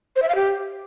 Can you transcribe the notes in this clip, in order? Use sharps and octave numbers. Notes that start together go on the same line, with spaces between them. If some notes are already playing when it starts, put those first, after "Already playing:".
C5
E5
F5
G4